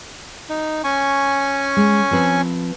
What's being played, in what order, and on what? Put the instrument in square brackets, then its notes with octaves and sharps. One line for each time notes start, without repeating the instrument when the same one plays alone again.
[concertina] D#4
C#4 G#5 C#6
[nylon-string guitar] G#3
F3 C4 B4